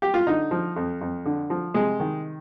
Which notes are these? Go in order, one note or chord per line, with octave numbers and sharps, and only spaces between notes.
G4
F4
D3 D#4
F3
F2
F2
D3
F3
C3 G#3
D#3